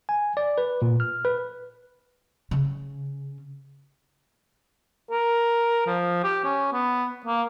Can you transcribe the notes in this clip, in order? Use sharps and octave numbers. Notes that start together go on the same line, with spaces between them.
G#5
D5
B4
A#2
F6
B4
C#3
A#4
F3
G4
C#4
B3
A#3